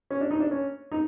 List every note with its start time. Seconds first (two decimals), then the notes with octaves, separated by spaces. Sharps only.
0.10 C#4
0.21 D4
0.31 D#4
0.40 D4
0.51 C#4
0.92 D#4